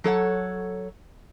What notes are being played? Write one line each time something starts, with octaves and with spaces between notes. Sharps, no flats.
F#3 A4 C#5 F#5